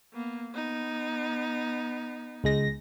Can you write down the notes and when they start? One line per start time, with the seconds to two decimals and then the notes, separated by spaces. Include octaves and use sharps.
0.14 A#3 B3
0.52 B3 D#4
2.44 C#2 G#3 A#6